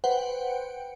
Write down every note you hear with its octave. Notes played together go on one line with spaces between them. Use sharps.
B4 C5 F#5 G5